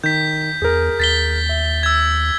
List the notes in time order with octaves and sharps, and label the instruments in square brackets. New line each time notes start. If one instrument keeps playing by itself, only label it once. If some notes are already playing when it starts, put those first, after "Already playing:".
[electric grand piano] D#3 [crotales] G6 B6
[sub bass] E2 [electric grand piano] G#4 A#4
[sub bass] D#2 [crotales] A6 B6 G7
[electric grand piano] E5
[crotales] E6 G#6